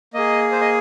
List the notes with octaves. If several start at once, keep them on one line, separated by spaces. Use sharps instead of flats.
A#3 G#4 D#5
C5
D#5